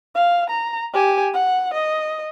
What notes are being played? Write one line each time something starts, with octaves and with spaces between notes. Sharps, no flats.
F5
A#5
G4 G#5
F#5
D#5